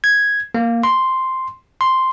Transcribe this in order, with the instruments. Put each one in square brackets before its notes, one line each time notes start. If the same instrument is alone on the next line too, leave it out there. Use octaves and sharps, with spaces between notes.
[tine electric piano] G#6
A#3
C6
C6